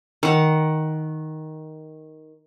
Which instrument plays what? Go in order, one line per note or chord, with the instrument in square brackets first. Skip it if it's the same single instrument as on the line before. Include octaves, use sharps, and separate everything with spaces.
[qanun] D#3 F#5